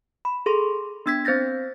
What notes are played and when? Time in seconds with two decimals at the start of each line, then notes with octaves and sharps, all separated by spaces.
0.25 B5
0.46 G#4 A4 C6
1.06 B3 D4 E6 G#6 B6
1.25 C4 C5 G6 A6 A#6